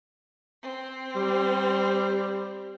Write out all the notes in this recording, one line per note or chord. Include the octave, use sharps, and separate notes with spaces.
C4
G3